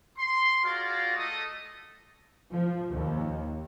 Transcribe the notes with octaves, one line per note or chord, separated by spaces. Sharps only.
C6
F4 F#4 G#4 A#4 D5 F5
A3 A4 D#5 D#6
F3
D#2